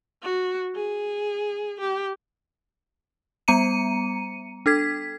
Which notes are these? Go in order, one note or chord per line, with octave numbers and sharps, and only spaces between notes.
F#4
G#4
G4
G3 B3 A#5 C#7 D#7
D4 A4 G#6 B6